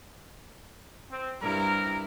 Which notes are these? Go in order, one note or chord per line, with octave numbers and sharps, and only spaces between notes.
C4
G2 C3 E4 A#4